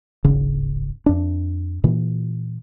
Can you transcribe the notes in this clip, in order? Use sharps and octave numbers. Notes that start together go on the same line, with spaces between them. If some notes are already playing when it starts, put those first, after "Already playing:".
D1 G#1 C#3
F2 D4
A#2 E3